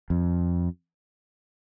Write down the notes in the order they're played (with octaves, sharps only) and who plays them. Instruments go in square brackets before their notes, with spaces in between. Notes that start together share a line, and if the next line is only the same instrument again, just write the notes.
[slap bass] F2